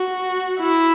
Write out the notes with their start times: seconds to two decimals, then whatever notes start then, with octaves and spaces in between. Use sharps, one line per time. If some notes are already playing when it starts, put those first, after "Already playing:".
Already playing: F#4
0.60 E4